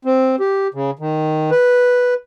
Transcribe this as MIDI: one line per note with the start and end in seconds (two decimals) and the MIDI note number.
0.05 0.36 60
0.40 0.68 67
0.74 0.91 49
0.99 1.51 51
1.51 2.14 71